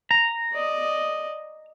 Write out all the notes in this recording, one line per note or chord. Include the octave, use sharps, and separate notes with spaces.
A#5
D5 D#5